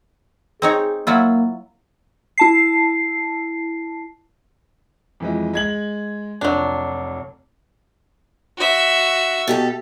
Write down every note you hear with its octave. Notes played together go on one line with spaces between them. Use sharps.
C4 D#4 G#4 C#5
F#3 A#3 E4 F4
E4 A5 C7
F2 E3 G#3
G#3 G#6 F#7
F1 F#3 D4
F#4 E5
B2 G4 A4